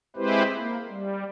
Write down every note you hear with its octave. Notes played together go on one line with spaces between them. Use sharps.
G#3 C4 E4 G4 B4 C5
A#3
G3